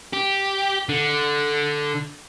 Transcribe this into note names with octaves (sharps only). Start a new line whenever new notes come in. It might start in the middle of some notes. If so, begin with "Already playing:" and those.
G4
D3